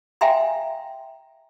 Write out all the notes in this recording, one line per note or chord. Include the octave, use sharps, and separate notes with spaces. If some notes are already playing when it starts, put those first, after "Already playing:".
E5 F5 G5 G#5 A#5 C6